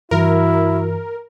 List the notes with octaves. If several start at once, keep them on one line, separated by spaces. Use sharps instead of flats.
G2 E3 E4 F#4 A#4